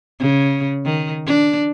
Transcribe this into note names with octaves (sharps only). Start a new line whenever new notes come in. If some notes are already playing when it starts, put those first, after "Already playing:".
C#3
D#3
D4